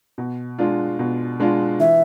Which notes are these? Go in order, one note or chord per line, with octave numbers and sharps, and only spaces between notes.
B2
G#3 D4 F4
B2
G#3 D4 F4
E3 E5